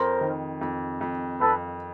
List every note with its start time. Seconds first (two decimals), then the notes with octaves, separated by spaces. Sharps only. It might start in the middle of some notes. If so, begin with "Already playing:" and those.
Already playing: F2 A#4 C5
0.21 D#3
0.61 F2
1.01 F2
1.41 F2 A4 B4